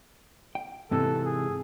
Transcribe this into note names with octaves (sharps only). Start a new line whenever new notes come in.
G5
G#2 C3 E3 A4
G#4